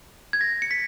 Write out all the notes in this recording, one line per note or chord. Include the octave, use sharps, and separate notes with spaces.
G#6
A#6
C#7
B6